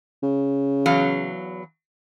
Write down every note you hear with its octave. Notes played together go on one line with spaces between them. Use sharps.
C#3
E2 F#3 F5